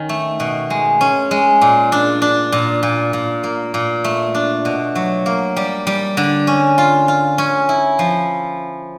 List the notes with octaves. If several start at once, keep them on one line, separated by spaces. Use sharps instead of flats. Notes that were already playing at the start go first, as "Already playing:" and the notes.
Already playing: D#3 C#4
A3
B2
G#3
C#4
G#3
A#2
D4
D4
A#2
A#2
A#2
A#3
A#2
A3
D4
B2
F#3
A#3
G3
G3
D3
C#4
F4
F4
C#4
E4
F3